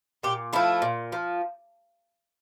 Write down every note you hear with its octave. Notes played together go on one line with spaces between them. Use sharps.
A#2 G4
F3 A3 E4
A#2
F3